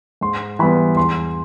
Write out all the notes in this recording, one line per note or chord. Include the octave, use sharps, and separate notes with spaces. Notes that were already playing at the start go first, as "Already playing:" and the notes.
G#2 C6
E3 G3 B3 B5
E2 C6